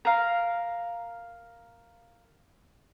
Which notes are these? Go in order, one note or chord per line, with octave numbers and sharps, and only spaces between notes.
A#4 F5